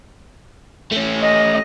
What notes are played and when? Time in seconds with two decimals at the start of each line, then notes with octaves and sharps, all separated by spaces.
0.92 A3 C#4
1.23 D#5